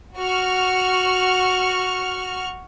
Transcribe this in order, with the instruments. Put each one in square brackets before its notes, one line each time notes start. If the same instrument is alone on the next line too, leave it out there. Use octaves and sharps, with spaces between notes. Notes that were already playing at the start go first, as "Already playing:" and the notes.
[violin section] F#4 C#6 F6